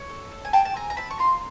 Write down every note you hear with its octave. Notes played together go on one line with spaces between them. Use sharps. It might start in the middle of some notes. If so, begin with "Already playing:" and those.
Already playing: C#5
A4
A4
G#5
G#4 G5 A5
A5
C4 G#5 A#5
A#5
C4 A5 B5
C#6
F4 A#5 C6